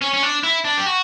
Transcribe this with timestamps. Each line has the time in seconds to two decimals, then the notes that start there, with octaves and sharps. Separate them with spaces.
0.02 C#4
0.13 C#4
0.23 D4
0.43 E4
0.65 D4
0.77 G4
0.86 F#4